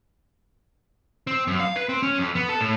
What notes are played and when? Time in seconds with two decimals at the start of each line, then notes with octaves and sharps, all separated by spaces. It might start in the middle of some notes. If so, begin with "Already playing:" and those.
1.27 C4
1.47 F#2
1.60 F5
1.76 B4
1.89 C4
2.03 C#4
2.18 F2
2.35 B3
2.49 A4
2.61 A2